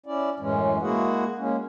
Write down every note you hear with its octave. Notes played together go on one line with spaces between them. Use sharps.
C#4 E4 D5
F#2 A2 E3 G#3 C#4
G#3 A#3 E4 F#4 G#4 F#5
G#3 A#3 C#4